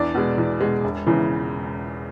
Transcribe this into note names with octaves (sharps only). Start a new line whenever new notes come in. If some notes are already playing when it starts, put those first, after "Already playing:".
Already playing: E2 D4 D5
B2 G#3
E2
B2 G#3
E1
E2 C#3 E3